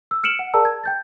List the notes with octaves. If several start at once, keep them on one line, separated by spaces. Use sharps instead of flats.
E6
F6 C#7 D7 E7 F#7
F#5
G#4 A#4 D5 A5 A#5 E6
G#6
G5 G6 A6